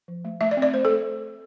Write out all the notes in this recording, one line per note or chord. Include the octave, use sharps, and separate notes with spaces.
F3
A3
A3 E5
D5
C4
D5
A3 C5
A4
A3